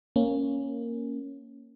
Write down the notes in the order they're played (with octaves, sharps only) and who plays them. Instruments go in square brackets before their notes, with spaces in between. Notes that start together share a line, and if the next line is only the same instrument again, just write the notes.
[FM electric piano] A#3 C#4